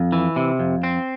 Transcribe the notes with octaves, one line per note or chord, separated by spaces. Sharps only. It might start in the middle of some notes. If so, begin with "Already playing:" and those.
Already playing: F2
E3
C3
F2
C4